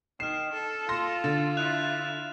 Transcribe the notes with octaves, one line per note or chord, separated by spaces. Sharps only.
D#3 F6 C7 E7
A4
F4 C6 A#6
D3 A6
E4 F#6 F7